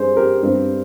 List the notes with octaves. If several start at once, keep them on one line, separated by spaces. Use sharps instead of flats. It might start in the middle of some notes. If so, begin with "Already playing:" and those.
Already playing: G2 G3 C4 G#4 C5
G4 A#4
G2 G3 C4